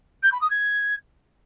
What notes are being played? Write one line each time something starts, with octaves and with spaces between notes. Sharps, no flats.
G6
B5
D#6
G#6